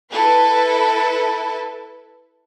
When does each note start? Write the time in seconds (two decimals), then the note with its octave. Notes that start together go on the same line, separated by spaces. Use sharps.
0.11 E4 A4 B4